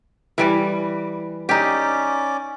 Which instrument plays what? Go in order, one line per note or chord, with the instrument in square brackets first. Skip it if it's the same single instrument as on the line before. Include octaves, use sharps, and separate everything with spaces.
[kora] E3 G3 D5
[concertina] C#4 D5 [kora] D#4 G4